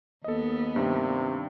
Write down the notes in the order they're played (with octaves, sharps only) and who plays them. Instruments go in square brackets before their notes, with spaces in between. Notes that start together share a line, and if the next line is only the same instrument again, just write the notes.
[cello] D#2 B3 [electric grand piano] A4 D#5
[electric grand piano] G2 D#3 [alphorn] C3